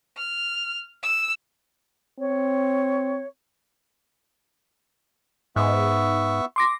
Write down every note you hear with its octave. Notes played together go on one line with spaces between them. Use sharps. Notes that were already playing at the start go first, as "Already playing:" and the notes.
F6
E6
C4 C#5
G#2 B3 E5 C#6
C6 D6 A#6